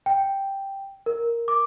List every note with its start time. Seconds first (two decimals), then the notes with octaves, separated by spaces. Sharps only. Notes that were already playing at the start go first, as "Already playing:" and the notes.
0.06 G5
1.06 A#4
1.48 D6